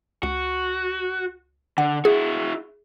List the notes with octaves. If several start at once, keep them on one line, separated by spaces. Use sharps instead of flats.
C#2 F#4
D3 F#5
E4 F#4 G#4